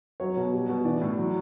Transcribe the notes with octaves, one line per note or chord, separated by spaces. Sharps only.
F#3 C#5
B2
G3
B2
E3 D5
A2
F#3